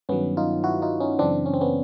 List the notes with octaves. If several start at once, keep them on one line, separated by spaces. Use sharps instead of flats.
G2 D#3 F#3 B3 C#4
D#4 F4
E4 F#4
D#4 F4
C#4 D#4
F#2 C#3 E3 C4 D4
C#4
C4
B3 C#4